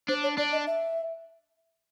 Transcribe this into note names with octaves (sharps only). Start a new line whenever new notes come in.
D4 C5
C#5
D4 D5
D#5
E5